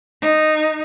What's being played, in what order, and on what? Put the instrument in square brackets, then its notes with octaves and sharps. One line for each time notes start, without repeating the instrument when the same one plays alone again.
[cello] D#4